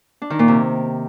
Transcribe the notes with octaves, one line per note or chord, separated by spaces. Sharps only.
D4
D#3
A#2
C3